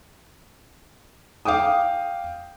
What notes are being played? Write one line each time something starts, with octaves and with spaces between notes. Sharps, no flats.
F5 G5 D6 D#6